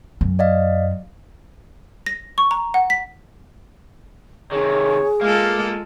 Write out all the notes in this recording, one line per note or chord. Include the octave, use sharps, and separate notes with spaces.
F#2
D5 D#5 F5
A#6
C#6
A#5
F#5
B6
C3 D#3 G#4 C#5
G#3 A#3 F4 A4 F5